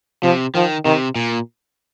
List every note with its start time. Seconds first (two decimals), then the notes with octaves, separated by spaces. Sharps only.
0.23 C3 F3
0.55 D#3 F3
0.85 C3 D#3
1.16 A#2